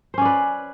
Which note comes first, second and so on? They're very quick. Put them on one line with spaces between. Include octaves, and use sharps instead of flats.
C5 C#4 D5 B4